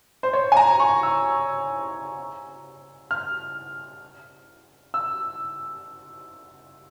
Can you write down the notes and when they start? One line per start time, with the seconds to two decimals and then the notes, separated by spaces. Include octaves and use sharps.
0.23 C5
0.33 C#5
0.52 G#5
0.57 A#5
0.80 C#6
1.03 E6
3.11 F6
4.94 E6